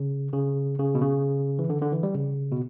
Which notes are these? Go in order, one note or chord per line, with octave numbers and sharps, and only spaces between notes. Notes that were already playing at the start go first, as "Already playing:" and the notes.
Already playing: C#3
C#3
C#3
B2
C#3
E3
D3
D3
E3
G3
C#3
B2